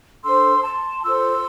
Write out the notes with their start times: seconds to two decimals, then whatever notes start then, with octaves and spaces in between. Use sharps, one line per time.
0.23 D4 A4 C5 C6 E6
0.64 A5 C6
1.05 F4 A4 C5 C6 E6